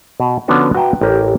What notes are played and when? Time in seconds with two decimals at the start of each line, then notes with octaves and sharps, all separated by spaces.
0.20 B2
0.48 D3 F3 B3 C#4 D4 F#4
0.75 F#4 B4 E5 G5 A5 A#5
1.01 A1 G4 A#4 C#5